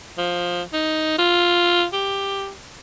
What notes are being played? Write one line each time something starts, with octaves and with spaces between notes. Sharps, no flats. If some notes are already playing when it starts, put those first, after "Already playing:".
F3
D#4
F4
G4